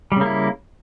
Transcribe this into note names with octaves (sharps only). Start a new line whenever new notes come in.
C#3 G3 A#3 E4